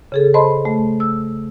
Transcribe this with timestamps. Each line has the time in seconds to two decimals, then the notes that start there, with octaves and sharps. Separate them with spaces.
0.12 C#3 G#4 A4
0.34 C5 D#5 A5 B5 C6
0.65 A3
1.00 E6